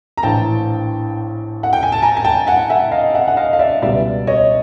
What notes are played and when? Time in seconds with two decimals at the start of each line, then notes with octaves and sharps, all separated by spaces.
0.17 A#5
0.23 A#1 A2 E3 G5 A5
1.63 F#5
1.73 G5
1.83 G#5
1.92 A5
2.02 G#5 A#5
2.17 G#5
2.24 G5 A5
2.47 F#5 G#5
2.70 E5 F#5
2.92 D#5 F5
3.14 E5 F#5
3.28 F#5
3.37 D#5 F5
3.53 F5
3.59 D5 E5
3.82 C#2 B2 G3 B3 D5 E5
4.27 C#5 D#5